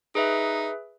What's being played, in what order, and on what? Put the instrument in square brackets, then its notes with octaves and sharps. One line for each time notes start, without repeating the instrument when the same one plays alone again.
[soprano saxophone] D#4 [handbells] G#4 B4 E5